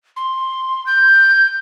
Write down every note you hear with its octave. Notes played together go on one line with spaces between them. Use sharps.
C6
G6